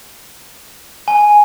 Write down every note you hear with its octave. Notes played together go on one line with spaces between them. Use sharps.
G#5